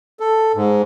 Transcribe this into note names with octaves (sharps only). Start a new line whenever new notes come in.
A4
G#2